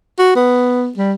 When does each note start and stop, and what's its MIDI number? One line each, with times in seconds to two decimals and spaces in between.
0.19 0.33 66
0.36 0.91 59
0.97 1.13 55